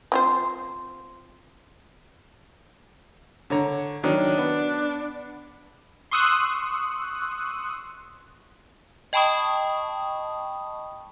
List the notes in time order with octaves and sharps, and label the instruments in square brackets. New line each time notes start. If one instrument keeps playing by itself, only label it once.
[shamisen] C4 F4 C5
[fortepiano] D3 C#5 A#5
[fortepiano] D#3 F#3 C#4 [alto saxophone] D4
[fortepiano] B3
[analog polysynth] C6 C#6 D#6 E6 F#6
[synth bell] D#5 G5 A5 B5 C#6 D#6